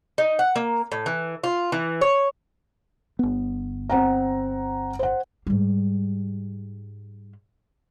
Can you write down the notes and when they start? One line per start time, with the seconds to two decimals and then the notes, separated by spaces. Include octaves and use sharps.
0.18 D#4
0.39 F#5
0.56 A#3
0.92 A2
1.06 E3
1.44 F4
1.72 E3
2.01 C#5
3.19 G1 B3
3.90 C4 F#5 A#5
4.99 C5 F#5
5.47 G#2 G3